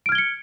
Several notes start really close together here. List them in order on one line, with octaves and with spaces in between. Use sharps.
D7 F6 G#6 G7 C#7